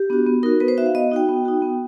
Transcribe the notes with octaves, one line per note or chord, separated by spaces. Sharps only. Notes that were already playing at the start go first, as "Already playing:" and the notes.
Already playing: G4
B3 D4 F#4
B3
D#4 F#4 A#4
B3 B4
C5
D#4 F#4 E5
F5
B3 D#5
D#4 F#4 G5
B3
D#4 F#4
B3